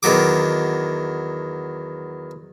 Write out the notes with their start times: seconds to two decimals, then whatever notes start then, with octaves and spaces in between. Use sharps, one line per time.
0.03 E2 D#3 F#3 D6